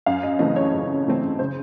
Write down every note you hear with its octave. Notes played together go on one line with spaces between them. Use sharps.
F#2 F5
D#5
C#3 E3 A3 C4 D#5
C#5
F#2
C#3 E3 A3 C4
C#3 C5